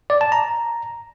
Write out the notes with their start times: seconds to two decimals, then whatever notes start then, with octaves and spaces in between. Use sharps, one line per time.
0.10 D5
0.21 A5
0.32 A#5